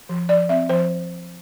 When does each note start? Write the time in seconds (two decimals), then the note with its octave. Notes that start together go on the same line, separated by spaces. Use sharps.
0.09 F3
0.29 F3 D5
0.49 C4 E5
0.69 F3 C5